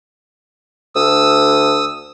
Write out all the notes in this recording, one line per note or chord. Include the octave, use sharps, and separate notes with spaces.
D2 D#6 E6